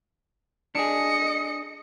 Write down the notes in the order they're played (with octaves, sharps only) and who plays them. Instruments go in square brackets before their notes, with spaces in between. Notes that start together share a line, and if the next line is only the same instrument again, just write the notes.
[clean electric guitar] D4 G#4 [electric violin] D#5 C#7